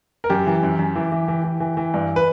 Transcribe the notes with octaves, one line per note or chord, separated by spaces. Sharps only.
A#4
F#2 G4
E3
F#2
F#2
E3
E3
E3
E3
E3
E3
G2
B4